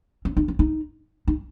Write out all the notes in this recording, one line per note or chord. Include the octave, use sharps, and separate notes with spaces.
C#4
D#4
C#4
D#4
D#4